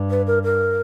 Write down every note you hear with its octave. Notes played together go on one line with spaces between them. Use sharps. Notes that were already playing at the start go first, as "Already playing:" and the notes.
Already playing: G2
B4
A#4
A#4